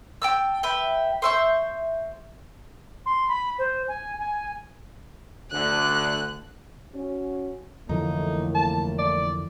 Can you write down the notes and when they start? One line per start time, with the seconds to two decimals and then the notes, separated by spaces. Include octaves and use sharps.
0.22 G5 A5 E6
0.63 B4 E5 G5
1.22 C5 E5 C#6
3.06 C6
3.28 B5
3.58 C5
3.88 G#5
4.19 G#5
5.51 D2 D3 A3 F#6
6.95 C#4 F#4
7.89 F2 A2 D3 E3 A3 A#3 D#4
8.55 A5
8.98 D5